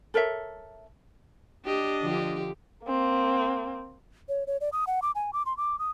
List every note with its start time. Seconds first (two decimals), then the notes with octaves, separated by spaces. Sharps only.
0.14 A4 A#4 C#5 E5
1.65 D4 G4 D#5
2.02 D3 F3 G4
2.85 A#3 C4
4.29 C#5
4.47 C#5
4.61 D5
4.73 D#6
4.87 F#5
5.02 D6
5.15 G#5
5.33 D6
5.46 C6
5.57 D6
5.79 D#6